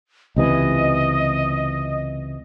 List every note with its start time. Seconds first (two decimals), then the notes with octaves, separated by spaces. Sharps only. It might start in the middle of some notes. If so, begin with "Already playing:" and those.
0.36 C#2 C3 E3 D#5